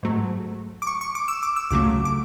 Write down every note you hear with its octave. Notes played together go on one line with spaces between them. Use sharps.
G#2 F#3 A3
D6
C#6
C#6
D6
E6
D6
E6
C#2 C#3 F#3 A3 D6
D6